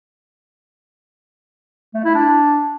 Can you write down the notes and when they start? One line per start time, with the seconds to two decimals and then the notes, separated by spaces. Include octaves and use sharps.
1.94 A3
2.04 E4
2.15 D4